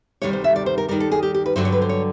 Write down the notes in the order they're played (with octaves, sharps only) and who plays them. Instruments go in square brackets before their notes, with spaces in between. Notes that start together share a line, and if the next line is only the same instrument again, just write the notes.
[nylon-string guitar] D2 C3 D#3 G3 C#5
C5
E5
D5
C5
A#4
D#2 D#3 G3 A#4
A4
G#4
G4
G4
B4
G2 D3 F#3 C5
C#5
B4
C5
C#5